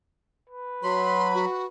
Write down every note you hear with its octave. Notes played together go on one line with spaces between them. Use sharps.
B4
F#3 B5 C6
F#4